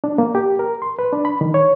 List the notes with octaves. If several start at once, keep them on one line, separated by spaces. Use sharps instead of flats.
D4
A#3
G4
A#4
C6
B4
D4
B5
D#3
C#5